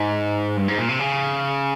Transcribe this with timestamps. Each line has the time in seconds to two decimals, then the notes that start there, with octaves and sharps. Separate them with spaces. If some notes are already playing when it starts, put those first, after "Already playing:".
Already playing: G#2
0.57 G2
0.68 G#2
0.78 A#2
0.89 C3
0.99 C#3